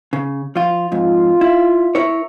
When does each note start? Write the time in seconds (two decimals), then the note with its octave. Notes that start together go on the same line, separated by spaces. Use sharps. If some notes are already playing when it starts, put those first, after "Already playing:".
0.13 C#3
0.56 F3 F4
0.92 F2 G#2 F4
1.41 E4
1.95 E4 A#4 C#5